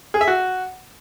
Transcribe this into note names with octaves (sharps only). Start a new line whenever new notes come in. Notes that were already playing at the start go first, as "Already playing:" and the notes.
G#4
E5
F#4